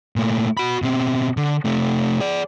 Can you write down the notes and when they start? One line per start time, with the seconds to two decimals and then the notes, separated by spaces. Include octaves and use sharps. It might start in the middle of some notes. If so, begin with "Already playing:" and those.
0.16 A#2 A3
0.57 F#4 B5
0.82 B2 C4
1.37 D3
1.65 C3 A3
2.20 G#4 D5